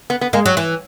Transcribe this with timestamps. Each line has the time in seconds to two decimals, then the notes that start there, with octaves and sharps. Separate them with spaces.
0.10 B3
0.21 B3
0.33 G#3 A#3
0.46 F#3
0.57 E3